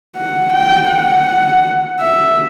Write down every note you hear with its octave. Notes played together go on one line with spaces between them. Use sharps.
F#5
G5
F#5
E5